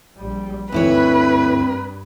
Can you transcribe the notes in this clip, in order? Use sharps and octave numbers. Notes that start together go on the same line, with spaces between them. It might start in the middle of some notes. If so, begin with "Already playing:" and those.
A#1 G3
D2 G2 C4 E4 B4 C#5